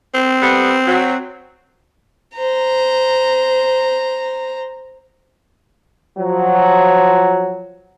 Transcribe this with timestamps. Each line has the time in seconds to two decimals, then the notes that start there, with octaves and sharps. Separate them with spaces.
0.14 C4
0.42 G3 A3 B3
0.86 F#3
2.37 C5 A#5
6.19 F3 F#3